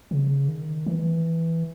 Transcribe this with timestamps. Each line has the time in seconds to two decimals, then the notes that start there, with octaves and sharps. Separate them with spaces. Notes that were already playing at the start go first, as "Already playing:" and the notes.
0.11 C#3
0.48 D#3
0.86 E3